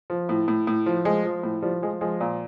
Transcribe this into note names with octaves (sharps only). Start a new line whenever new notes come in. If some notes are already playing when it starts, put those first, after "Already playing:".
F3
A2
A2
A2
F3
F3 G#3
F3
A2
F3 G3
F3 G#3
F3 G#3
A#2